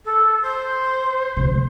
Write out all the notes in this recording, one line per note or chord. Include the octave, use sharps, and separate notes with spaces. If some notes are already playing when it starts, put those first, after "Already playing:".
A4
C5
D2 C3